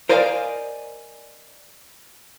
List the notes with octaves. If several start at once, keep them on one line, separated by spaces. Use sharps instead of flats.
A#4 C5 D5 D#5 F5 G#5